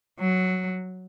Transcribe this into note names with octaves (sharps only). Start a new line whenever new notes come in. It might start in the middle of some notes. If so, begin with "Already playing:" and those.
F#3